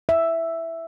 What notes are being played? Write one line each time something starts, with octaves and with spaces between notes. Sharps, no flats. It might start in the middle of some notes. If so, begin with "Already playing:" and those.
E5